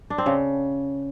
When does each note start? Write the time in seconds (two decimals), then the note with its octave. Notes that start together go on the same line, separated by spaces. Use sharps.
0.10 D4
0.18 C4
0.26 C#3